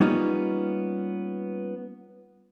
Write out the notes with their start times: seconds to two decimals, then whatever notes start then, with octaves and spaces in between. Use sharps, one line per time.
0.01 G3 A#3 B3 C#4 D#4 F4